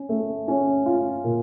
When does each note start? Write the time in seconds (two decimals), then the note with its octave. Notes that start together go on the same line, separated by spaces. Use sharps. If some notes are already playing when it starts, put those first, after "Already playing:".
Already playing: C#4
0.09 A3
0.48 C#4
0.86 F4
1.24 A#2